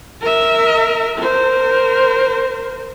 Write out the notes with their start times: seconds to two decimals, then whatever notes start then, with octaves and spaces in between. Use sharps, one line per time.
0.22 A#4 E5
1.18 A#4 C5